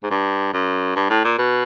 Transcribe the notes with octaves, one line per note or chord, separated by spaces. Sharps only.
G#2
G2
F#2
G2
A2
A#2
B2